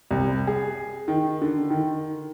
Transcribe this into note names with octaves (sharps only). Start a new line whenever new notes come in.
C2
G#4
D#3
D3
D#3